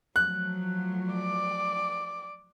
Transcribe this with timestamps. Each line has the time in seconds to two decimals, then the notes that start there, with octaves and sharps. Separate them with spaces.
0.16 F3 F#3 A3 F#6
1.12 D5 D6